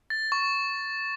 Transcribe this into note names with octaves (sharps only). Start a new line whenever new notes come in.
A6
C#6